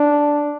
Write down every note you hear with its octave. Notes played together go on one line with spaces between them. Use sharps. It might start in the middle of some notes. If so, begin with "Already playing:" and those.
Already playing: D4